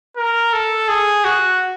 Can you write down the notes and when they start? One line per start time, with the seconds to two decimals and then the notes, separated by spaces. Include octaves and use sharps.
0.17 A#4
0.53 A4
0.88 G#4
1.24 F#4